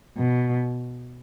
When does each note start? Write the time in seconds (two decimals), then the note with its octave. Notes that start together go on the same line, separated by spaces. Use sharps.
0.17 B2